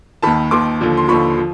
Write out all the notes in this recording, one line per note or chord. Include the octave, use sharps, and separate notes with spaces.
D#2 D#3 A5 B5
D#2 D#3 C6 D6
D#2 D3 F3
C6
D#2 D3 F3 B5 C#6
F3